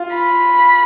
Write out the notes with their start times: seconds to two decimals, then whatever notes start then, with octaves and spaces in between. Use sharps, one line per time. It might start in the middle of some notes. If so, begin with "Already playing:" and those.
Already playing: F4
0.16 B5